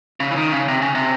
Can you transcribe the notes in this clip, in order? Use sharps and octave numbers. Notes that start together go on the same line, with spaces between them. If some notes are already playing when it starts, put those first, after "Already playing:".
C#3
E3
D#3
C#3
C3
C#3
C3